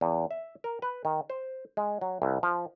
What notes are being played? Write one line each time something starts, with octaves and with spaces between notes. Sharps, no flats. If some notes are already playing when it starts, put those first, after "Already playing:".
E2
E5
A#4
B4
D#3
C5
G#3
F#3
C2
F3